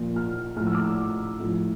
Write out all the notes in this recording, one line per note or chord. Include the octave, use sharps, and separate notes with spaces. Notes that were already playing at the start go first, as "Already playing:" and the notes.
Already playing: A#2 F3
F6
A2 F3 F6
E6
D6
E6
A2 F3